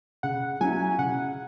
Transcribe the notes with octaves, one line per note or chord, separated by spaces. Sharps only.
C#3 F#5
F#3 C#4 E4 G#5
C#3 F#5